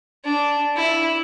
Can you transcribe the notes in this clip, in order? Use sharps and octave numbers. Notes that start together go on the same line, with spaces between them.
D4
E4